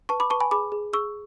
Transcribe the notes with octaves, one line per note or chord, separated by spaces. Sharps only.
B4 A5 C#6
B5 D6
B4 A5 C#6
G#5 B5
G#4 B5 D6
G#4
G#4 C#6 E6